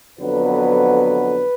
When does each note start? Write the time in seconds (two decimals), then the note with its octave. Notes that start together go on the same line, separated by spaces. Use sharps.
0.19 F2 D3 F#3 B3 B4